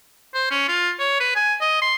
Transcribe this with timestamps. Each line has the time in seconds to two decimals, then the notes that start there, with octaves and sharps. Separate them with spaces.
0.34 C5
0.51 C#4
0.68 F4
0.99 C#5
1.20 B4
1.35 G#5
1.61 D#5
1.82 C6